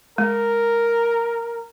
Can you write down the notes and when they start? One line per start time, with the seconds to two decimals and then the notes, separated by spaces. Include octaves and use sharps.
0.18 G#3 A#4